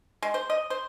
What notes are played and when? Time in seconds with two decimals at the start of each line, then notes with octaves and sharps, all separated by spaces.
0.22 G#3
0.34 C5
0.50 D#5
0.70 C5